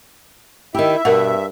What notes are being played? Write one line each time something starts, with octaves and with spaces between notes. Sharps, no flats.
D#3 E4 G4 E5
G2 B2 A#4 F#5